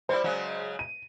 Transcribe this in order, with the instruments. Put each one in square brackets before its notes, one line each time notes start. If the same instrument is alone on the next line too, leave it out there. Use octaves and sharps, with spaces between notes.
[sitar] G3 E4 [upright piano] C5 D5
[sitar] C#3 F#3 G#3
[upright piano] D#7